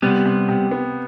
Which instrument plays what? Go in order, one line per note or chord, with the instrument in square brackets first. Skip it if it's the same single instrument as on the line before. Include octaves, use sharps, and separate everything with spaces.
[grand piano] C3 [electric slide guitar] G3 B3
[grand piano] C3
C3
B3